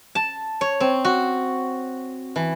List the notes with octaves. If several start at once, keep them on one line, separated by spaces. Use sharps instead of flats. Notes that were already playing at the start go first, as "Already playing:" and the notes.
A5
C#5
C4
F#4
E3